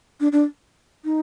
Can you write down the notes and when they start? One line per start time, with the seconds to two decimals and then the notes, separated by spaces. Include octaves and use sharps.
0.20 D4
0.32 D4
1.05 D#4